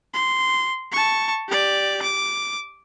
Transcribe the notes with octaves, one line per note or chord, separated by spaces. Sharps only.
C6
A5 C#6
G4 D5
D6